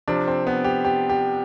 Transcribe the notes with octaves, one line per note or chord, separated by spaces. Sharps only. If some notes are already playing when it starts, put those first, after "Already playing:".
C3 F3 D4
C4
B3
G4
G4
G4